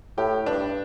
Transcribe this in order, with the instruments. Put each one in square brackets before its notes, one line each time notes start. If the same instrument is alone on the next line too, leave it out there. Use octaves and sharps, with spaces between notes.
[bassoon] A2 [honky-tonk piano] G4
[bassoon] G2 [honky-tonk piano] D4